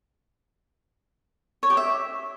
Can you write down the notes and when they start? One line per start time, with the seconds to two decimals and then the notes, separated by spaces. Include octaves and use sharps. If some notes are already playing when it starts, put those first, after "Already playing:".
1.63 C#5
1.70 G4
1.77 E5